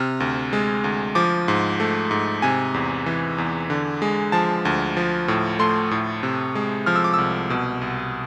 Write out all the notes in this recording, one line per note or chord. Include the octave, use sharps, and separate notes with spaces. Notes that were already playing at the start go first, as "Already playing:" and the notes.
Already playing: C3 F6
D2
G#3
D2
F3 D6
G#2
A3
G#2
C3 G#5
E2
E3
E2
D3
G#3
F3 A5
D2
F3
A2
A3 C6
A2
C3
G#3
F3 F6
E6
D6
C2 E6
B2
C2